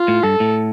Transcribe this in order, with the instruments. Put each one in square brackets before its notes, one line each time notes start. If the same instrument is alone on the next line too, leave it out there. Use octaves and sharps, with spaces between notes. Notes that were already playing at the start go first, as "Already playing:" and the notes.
Already playing: [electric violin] F4
[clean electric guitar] A2
[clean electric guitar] G2 [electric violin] A4
[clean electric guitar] A2